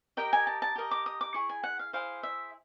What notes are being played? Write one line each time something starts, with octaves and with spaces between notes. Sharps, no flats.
G4 A#4 D#5 G5
G#5
A5
A5
G4 A#4 D#5
D6
D#6
D6
E4 G#4 C#6
G#5
F#5
F5
E4 G#4 C5 F5
E5